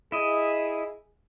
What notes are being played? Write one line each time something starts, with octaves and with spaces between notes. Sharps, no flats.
E4 G#4 D#5